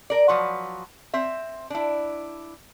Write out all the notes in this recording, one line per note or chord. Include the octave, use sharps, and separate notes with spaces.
A#4 D5
F3 F#3 B4
C4 E5
D4 E4